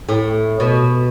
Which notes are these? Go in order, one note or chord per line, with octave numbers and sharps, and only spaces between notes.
A2
B2